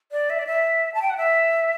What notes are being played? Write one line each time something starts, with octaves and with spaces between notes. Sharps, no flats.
D5
E5
D5
E5
A5
G5
F#5
E5